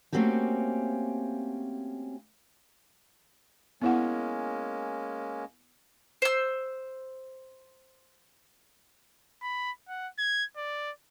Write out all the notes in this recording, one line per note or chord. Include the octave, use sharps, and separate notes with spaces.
A3 A#3 C4 C#4 F#4 G4
G#3 A#3 B3 C#4 E4 F#5
C5 E6
B5
F#5
G#6
D5